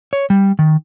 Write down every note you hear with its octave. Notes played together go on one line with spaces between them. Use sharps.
C#5
G3
D#3